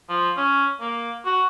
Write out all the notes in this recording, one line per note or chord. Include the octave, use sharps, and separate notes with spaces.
F3
C#4
A#3
F#4